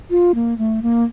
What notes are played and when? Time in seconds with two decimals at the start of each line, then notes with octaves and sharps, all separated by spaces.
0.10 F4
0.35 A#3
0.58 A3
0.82 A#3